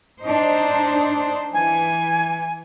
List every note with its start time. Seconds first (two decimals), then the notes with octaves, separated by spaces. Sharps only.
0.21 D4 D#4 C5
1.54 E3 G#5